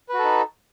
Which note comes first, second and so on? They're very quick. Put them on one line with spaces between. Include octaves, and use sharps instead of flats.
B4 F#4 A4 D#4